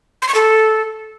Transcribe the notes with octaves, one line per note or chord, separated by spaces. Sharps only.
C6
C#6
A4